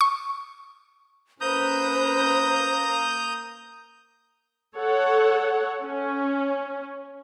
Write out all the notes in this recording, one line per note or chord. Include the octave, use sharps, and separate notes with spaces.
C#6
A#3 C#4 B4 C5 A#5 D#6 G6
A4 C#5 F#5
C#4